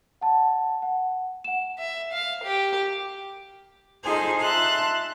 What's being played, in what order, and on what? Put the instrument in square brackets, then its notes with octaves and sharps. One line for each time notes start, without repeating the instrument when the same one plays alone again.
[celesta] F#5 A5
F#5
F#5 E7
[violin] E5
F5
G4
[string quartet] D#4 F4 G#4 A4 C5 G#5
E5 F5 A5 C6 F#6